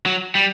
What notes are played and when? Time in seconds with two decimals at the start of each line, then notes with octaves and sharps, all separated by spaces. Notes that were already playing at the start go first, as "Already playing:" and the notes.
0.06 F#3
0.35 G3